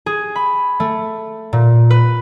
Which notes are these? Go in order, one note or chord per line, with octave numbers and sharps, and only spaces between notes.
G#4
B5
A3
A#2
B4